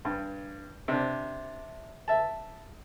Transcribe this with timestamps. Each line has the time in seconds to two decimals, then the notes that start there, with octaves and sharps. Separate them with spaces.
0.05 G2
0.88 C3 D4
2.08 E5 A5